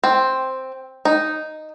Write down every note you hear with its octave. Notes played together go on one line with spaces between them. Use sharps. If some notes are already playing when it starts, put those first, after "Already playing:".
C4
D#4